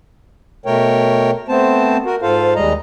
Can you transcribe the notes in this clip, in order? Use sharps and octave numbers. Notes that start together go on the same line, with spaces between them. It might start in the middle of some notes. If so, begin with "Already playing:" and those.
B2 A3 A#4 C#5 G5
A3 B3 C4 C5 A5
F#4 A#4
G#2 F4 A4 C5 F5
D#2 G3 G#3 D#5 A#5